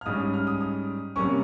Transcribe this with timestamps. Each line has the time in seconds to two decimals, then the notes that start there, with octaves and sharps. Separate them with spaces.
0.01 F6
0.06 G#2 G3 C#4 D#6
0.20 D#6
0.34 F6
0.47 D#6
0.61 D#6
1.16 C3 G3 A#3 C#4 C#6